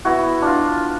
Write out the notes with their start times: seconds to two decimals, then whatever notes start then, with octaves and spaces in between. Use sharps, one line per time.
0.05 B3 E4 F#4
0.42 D4 F4